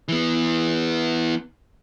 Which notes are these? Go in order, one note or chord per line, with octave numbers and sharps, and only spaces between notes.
E3 B3